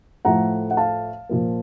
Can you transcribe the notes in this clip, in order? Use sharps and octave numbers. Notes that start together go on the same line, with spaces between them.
A2 F3 A3 F#5 A#5
F#5
F5 A5
A#2 F3 A#3